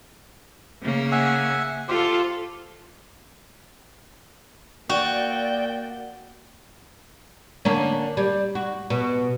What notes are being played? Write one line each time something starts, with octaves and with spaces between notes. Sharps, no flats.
C#3 A#3
E5 F#5 G#5
F4 G4 A4 C5
A#3 F#4 D5 G5
D3 A#3 C#4
G3
F#4
B2